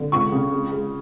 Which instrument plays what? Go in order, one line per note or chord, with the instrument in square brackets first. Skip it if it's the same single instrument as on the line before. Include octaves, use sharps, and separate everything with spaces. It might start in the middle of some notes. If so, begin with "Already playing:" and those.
Already playing: [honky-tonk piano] D3
C#2 C#6
C#3
G#3
G#3